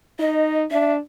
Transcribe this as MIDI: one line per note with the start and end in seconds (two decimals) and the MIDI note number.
0.19 0.65 63
0.19 0.57 75
0.71 0.99 62
0.71 0.93 76